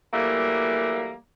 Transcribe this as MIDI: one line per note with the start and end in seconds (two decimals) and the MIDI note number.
0.14 1.14 52
0.14 1.14 54
0.14 1.14 55
0.14 1.14 57
0.14 1.14 58